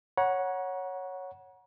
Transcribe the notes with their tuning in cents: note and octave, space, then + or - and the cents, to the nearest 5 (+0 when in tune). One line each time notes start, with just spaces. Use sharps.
C#5 +0 F#5 -5 A#5 +40